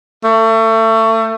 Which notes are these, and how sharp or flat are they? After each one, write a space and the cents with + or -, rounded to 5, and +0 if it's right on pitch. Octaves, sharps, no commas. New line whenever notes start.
A3 +30